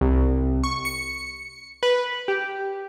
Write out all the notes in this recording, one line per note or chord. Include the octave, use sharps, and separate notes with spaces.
C2
C#6
C#7
B4
G4